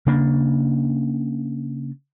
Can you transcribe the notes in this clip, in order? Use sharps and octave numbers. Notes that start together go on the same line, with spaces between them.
C#3 A#3 D4